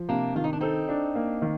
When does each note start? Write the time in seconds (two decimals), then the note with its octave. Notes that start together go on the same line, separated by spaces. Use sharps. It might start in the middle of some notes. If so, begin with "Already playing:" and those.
Already playing: F3
0.09 C3 A#3 D4
0.35 D#3 F4
0.44 D#4
0.53 D4
0.60 C4 D#4 A4
0.89 D4
1.15 A#3
1.42 D#3